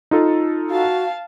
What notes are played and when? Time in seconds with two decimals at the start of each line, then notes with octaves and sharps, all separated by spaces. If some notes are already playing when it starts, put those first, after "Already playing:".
0.11 D#4 F4 A4
0.70 F#4 F5 A5